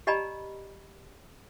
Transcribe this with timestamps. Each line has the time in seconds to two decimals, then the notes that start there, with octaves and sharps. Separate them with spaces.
0.07 G4 D5 D#5 G#5 A#5 B5